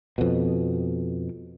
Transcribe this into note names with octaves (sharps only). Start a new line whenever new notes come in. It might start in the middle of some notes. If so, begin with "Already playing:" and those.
F2 B2